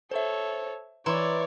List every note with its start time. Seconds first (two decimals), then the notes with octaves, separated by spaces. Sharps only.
0.11 A4 C5 C#5 E5
1.06 E3 E4 C#5 D5 A#5 C6